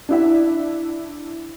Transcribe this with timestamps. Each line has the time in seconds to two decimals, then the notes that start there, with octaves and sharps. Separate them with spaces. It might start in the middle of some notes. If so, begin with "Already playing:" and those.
0.09 D4 E4 E5